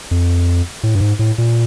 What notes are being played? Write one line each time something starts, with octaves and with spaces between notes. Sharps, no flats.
F2
A2
G2
G#2
A2
A#2